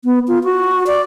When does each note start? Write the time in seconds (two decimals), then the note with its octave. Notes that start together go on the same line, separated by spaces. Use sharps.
0.05 B3
0.28 F4
0.44 F#4
0.87 D5